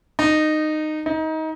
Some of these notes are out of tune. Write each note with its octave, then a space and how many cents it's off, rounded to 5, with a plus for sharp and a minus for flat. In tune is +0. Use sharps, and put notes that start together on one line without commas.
D#4 -15
D#4 +25